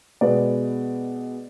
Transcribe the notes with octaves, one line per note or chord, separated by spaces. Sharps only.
B2 G#3 B3 D5